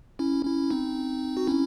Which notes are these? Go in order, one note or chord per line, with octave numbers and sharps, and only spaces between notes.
C#4 E4
C#4 E4
C4 D#4
F#4
C#4 E4